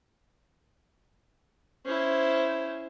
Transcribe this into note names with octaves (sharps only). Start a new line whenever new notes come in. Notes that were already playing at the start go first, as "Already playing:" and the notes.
C#4 E4 C5